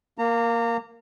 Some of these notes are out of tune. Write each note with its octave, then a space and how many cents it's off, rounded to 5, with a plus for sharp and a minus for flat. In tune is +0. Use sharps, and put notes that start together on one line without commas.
A#3 +0 A#5 -30